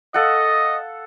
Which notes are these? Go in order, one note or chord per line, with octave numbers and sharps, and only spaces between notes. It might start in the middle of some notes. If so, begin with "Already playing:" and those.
A4 D#5 F5 F#5